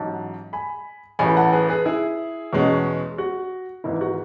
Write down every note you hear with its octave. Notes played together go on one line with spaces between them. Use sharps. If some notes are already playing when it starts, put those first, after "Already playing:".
Already playing: A1 G#2 F#3 A5
G#5 B5
A1 A2 E3 G#5 B5
F#5 A5
G#4 B4
G#4 B4
E4 G#4
E2 B2 G#3 C#4
F#4
G#1 G#2 E3 E4
F#4